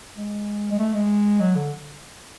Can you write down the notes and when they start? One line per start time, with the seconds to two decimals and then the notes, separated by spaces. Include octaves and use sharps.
0.17 G#3
0.71 G#3
0.79 A3
0.94 G#3
1.40 F#3
1.55 D3